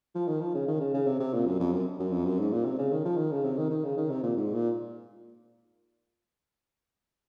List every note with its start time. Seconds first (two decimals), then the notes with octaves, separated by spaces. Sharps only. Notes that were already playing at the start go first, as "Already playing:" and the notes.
0.15 F3
0.28 D#3
0.41 F3
0.54 C#3
0.68 D#3
0.80 C#3
0.94 C#3
1.07 C3
1.20 C3
1.33 A#2
1.46 F#2
1.60 F2
1.72 F#2
1.99 F#2
2.12 F2
2.25 F#2
2.39 G#2
2.52 A#2
2.65 C3
2.78 C#3
2.92 D#3
3.05 F3
3.17 D#3
3.31 C#3
3.44 C3
3.57 D#3
3.70 D#3
3.84 C#3
3.97 D#3
4.10 C3
4.23 A#2
4.36 G#2
4.53 A#2